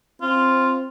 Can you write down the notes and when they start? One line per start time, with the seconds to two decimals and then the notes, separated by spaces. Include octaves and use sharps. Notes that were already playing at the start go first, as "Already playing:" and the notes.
0.22 C4 F4